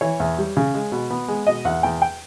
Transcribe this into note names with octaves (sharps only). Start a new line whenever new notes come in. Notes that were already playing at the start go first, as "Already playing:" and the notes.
E3 C#5
E2
G3
C#3
G#3
B2
B3
G#3
B2 D#5
E2 F#5
E2 G5
G5